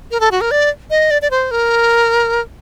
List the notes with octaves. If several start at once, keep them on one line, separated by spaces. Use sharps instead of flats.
A#4
A4
F#4
A#4
D5
D#5
D5
D5
C5
A#4